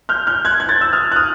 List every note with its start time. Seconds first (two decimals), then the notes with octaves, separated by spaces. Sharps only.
0.09 F6 G6
0.27 F6 G6
0.45 F#6 G#6
0.60 G#6
0.69 G6 A6
0.81 E6
0.92 D#6 F6
1.12 F#6
1.16 D#6 F6